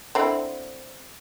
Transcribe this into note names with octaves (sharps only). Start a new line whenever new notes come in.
D3 C4 E4